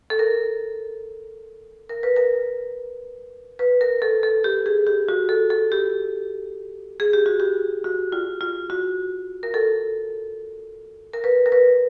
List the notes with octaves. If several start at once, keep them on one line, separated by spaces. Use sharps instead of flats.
A4
A#4
A#4
B4
A#4
B4
A#4
A4
A4
G4
G#4
G4
F#4
A4
A4
G4
G#4
G4
F#4
G4
F#4
F4
F4
F#4
A#4
A4
A#4
B4
A#4
B4